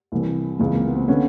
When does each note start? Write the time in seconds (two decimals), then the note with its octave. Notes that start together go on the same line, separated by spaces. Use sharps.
0.12 C2 C3 E3
0.59 C#2 C3 E3
0.73 A#3
0.85 B3
0.96 C4
1.08 D3 B3 C#4